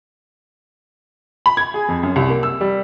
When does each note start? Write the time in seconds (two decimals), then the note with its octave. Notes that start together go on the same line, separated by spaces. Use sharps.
1.46 B5
1.57 G#6
1.74 G#4
1.88 F2
2.03 F#2
2.16 C2
2.30 A#3
2.43 E6
2.61 G3